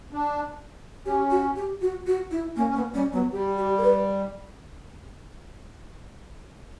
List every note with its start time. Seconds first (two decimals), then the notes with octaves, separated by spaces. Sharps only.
0.12 D4
1.06 C#4 G4
1.31 F#4
1.56 G4
1.81 F#4
2.07 F#4
2.31 E4
2.56 A#3 C#4
2.69 C#4
2.75 A#3 B3
2.94 G3 C#4
3.13 F#3 B3
3.32 G3 G4
3.57 G4
3.78 A#4
3.83 B4